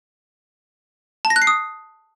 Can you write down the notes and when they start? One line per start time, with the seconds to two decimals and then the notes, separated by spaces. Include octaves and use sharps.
1.25 A5
1.30 A#6
1.36 F#6
1.42 C7
1.47 D#6